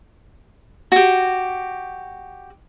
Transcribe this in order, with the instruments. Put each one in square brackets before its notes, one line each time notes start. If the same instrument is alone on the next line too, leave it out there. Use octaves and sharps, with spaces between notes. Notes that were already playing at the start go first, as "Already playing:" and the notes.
[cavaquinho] F#4 G4